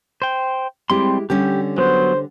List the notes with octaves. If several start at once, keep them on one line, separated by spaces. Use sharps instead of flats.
C5 G5
G3 G#3 C4 E4 G4 C6
D3 G3 C#4 G4
F#3 B3 C5